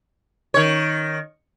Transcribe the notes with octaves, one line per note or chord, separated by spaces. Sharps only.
D#3 C#5